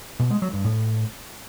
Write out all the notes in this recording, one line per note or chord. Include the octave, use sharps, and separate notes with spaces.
B2
G#3
F#3
G2
A2